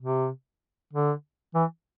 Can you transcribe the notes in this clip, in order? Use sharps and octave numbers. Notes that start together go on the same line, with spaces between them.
C3
D3
E3